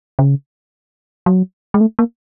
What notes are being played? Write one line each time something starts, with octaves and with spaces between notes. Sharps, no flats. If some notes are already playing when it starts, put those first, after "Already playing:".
C#3
F#3
G#3
A3
A#3